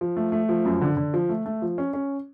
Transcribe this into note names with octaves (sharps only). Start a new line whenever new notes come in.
F3
A3
A3
F3
F#2
D3
D3
F3
A3
A3
F3
C#4
C#4